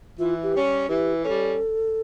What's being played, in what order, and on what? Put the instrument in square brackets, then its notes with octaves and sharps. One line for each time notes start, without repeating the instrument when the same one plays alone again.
[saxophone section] E3 [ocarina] F4
[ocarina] G4
[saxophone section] G3 C#4
[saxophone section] E3 [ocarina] G4
[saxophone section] G3 C#4 [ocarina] A4